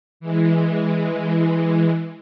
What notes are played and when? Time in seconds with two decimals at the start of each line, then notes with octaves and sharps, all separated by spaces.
0.20 E3 G#3